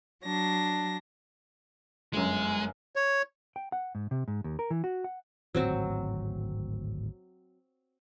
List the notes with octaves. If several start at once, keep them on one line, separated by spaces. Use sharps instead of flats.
F#3 D4 A#6
G1 F#2 G#3
C#5
G5
F#5
G#2
C3
G#2
D#2
A#4
E3
F#4
F#5
D1 G#1 F#3 C4 F#4